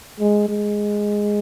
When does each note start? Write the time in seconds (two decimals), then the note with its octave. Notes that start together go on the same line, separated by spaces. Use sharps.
0.20 G#3
0.49 G#3